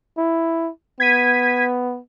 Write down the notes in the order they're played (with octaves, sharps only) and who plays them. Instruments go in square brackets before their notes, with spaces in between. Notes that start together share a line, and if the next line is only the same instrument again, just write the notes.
[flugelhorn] E4
[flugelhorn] B3 [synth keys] G#6 B6 D#7